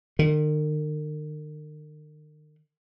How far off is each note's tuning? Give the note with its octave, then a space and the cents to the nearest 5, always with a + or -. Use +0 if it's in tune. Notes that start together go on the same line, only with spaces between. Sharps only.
D#3 -40